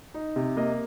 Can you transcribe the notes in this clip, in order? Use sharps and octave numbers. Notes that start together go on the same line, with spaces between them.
D#4
C3
A#3 D#5